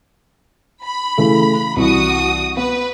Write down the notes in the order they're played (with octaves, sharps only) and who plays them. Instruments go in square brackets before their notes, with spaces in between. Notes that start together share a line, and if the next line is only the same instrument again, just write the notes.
[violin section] B5
[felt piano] C#3 E3 A3
[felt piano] C2 E3 [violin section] F#4 D#6
[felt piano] B3 [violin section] B4